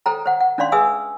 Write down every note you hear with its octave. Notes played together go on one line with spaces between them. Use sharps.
A4 C5 G5 A#5
C5 F#5
F#5
C#4 D4 D5 F5 C6
G#4 B4 E5 G#5 D#6 E6